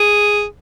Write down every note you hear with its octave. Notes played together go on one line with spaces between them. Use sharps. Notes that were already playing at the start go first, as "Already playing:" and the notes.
Already playing: G#4